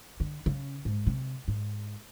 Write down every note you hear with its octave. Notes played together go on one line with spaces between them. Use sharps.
D3
C#3
G#2
C3
G#2